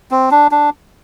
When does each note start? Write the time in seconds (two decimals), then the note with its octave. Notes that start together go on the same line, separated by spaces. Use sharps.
0.11 C4
0.31 D4
0.51 D4